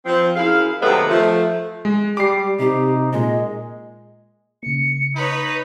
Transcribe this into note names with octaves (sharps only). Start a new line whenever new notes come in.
F3 C4
F#2 E4 G#4 F5
C3 D#3 F#3 G#3 A3 B3
F3 A3
G#3
G3 G4 D6 C7
C3 D#4 G4
A#2 G#3 D#5
C#3 A#3 C#7
D#4 B4 C#5 B5